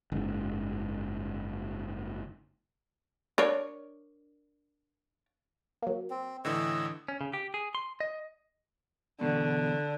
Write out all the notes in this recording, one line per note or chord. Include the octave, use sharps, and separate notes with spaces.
F#1 G#2
D4 A#4 C#5
F#3 A#3
C4
A2 D3 E3 D#5 E6
C#4
C#3
G4
G#4
C6
D#5
E2 B2 D3